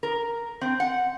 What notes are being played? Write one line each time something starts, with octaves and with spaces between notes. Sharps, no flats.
A#4
C4
F#5